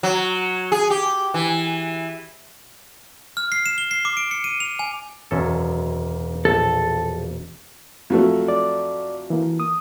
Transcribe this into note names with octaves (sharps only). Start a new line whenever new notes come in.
F#3
G#4
G4
E3
F6
C7
E7
G7
C7
D6
D7
C#7
D#7
F7
G#5
E1 F#2 C#4 A4
A#1 A4
F2 F#3 A3
D5
E3 A#3
D#6